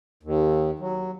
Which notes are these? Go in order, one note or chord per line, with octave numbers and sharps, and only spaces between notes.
D#2
F#3